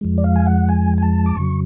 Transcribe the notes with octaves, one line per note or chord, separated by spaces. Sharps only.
F2 F3 G#3
D5
F5
G#5
F#5
G#5
G#5
A5
D6
F2 C#3 F#3 C#6